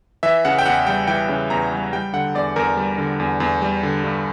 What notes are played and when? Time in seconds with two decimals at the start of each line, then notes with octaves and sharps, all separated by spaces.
0.23 E3 E5
0.45 C#3 F#5
0.59 G5
0.66 E2 F#5
0.87 G3 G5
1.07 E3 G5
1.29 C#3
1.50 E2 A#5
1.71 G3
1.93 G3 G5
2.13 D3 F#5
2.35 E2 D5
2.56 E2 A#4
2.77 G3
2.98 D3
3.20 E2
3.40 E2
3.62 G3
3.83 D3
4.04 G2